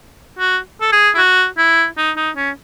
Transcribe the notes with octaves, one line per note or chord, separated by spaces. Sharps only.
F#4
A4
G#4
E4
F#4
E4
D#4
D#4
C#4